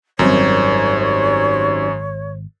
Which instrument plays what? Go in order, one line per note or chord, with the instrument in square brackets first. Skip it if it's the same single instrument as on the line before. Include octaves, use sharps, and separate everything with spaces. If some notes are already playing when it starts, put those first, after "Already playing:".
[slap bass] G#1 [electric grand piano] F#2 [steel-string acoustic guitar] D#3 G3 C4 [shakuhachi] C#5